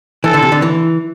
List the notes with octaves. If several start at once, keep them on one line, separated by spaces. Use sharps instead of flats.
E3 A4
D3
C3
D3
E3